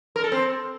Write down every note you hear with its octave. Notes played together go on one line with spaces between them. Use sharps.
A#4
A4
C4